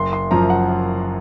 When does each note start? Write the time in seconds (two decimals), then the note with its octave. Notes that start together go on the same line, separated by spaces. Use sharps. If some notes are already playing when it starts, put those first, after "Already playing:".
Already playing: F#1 C6
0.13 C6
0.31 F#2 F3 A#5
0.50 F#5